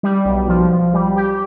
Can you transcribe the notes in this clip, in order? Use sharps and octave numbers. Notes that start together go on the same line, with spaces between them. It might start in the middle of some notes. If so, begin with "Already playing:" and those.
G3
B1
F3
F3
G3
G4